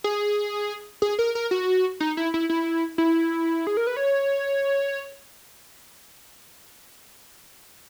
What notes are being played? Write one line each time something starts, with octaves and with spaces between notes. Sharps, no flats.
G#4
G#4
A#4
A#4
F#4
D#4
E4
E4
E4
E4
G#4
A#4
B4
C#5